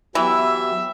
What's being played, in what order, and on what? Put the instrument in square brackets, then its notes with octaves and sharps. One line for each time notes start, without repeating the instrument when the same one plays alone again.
[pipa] E3 [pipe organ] F#3 B3 G4 [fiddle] E5